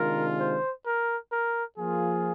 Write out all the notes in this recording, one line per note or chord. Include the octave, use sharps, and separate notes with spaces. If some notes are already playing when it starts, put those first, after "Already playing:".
Already playing: C3 D#3 G#3 D4 F4 A#4
C5
A#4
A#4
F3 A#3 F4 G#4